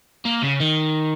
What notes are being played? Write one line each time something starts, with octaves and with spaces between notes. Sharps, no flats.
A#3
C#3
D#3